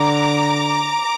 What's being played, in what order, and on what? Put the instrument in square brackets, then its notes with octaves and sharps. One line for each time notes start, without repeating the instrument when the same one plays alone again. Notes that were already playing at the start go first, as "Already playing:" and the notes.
Already playing: [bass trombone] D3 [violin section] A#5 D6